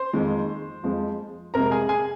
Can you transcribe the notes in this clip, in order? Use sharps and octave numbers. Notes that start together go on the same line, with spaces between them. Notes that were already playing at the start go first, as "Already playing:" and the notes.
Already playing: C5 C6
F2 D#3 G#3
F2 F3 G#3
F2 C3 G#3 A#4 A#5
G#4 G#5
G#4 G#5